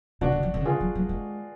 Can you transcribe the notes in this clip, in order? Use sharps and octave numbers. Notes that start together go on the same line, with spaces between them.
C#3 D4 F#4
D3
F3
D3
C#3
D3 F4 G#4
F#3
F#3
G#3